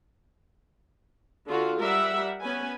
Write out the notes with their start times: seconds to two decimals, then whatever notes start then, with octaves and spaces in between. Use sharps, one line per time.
1.47 D3 F4 F#4
1.80 G3 A#4 E5 F#5
2.42 B3 C#4 B4 G#5